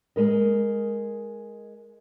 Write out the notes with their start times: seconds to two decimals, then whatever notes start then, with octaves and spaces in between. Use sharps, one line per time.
0.16 G#3 A#4 D#5